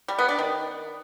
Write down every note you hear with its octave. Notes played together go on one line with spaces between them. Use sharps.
G3
B3
D4
D#3